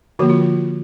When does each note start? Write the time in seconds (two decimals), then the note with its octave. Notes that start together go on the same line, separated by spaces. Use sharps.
0.19 D3 F3 A#3 F#4
0.30 F4